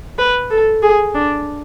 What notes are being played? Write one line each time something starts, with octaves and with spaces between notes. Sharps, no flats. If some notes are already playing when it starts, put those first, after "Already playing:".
B4
A4
G#4
D4